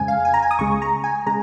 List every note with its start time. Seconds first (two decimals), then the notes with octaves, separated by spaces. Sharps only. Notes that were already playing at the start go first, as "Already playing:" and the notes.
Already playing: F2 C#3 G#3 G#5
0.08 F5
0.25 G#5
0.34 A#5
0.42 G#5
0.51 D#6
0.59 C#2 C#3 G#3 C#6
0.82 A#5
1.04 G#5
1.26 C#3 G#3 A#5